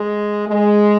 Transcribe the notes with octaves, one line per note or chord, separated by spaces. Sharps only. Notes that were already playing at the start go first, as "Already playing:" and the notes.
Already playing: G#3
G#3